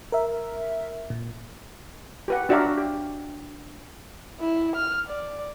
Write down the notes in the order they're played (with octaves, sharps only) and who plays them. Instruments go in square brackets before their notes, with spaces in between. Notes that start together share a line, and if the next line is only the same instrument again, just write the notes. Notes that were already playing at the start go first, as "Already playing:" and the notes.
[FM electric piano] A#4 E5
A#2
[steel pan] G4 B4 F#5
D4 F#4 D5 E5 F5 A#5
G4
[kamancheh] E4
F6
D5